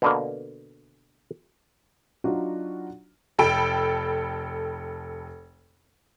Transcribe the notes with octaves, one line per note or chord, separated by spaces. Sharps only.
B2 D3 A#3
F#3 D4 D#4 F4 F#4
F1 A4 G5 B5 D7